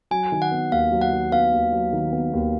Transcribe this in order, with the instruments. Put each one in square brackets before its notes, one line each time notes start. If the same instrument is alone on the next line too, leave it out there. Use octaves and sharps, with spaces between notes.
[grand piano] F#3 [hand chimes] G#5
[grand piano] D#3
[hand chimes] F#5
[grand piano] B3
[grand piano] D#2 [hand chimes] F5
[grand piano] F#3
[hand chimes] F#5
[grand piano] D#3
[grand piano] B3 [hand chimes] F5
[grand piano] D#2
F#3
D#3
B3
D#2